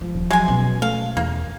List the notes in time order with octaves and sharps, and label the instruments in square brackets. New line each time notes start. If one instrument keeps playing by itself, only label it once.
[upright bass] F3
[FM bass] D#1
[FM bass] F#3 [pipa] G#3 G#5
[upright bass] B2 C#4
[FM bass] A3 [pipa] F5
[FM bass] E2 [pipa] A#3